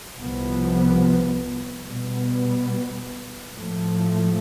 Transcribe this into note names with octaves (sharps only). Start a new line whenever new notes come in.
C2 C3 F3 B3
B2 G3 B3
A2 F3 A3